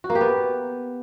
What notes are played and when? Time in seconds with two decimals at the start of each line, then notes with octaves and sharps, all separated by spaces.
0.04 F#4
0.10 A#3
0.15 G4
0.21 B3